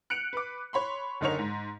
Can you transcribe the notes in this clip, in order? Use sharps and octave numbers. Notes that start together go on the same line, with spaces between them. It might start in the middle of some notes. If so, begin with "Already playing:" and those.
F#6 C#7 D7 F7
B4 D6
C#5 B5 C6
F#1 D3 D#4 A#4 C#5 F7
G#2